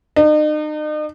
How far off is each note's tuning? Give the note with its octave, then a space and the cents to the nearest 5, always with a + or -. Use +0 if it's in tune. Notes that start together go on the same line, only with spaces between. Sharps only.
D#4 -40